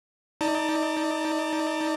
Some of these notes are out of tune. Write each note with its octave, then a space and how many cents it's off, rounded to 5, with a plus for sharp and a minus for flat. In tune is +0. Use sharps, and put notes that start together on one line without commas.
D#4 +25 D5 +0 A5 +35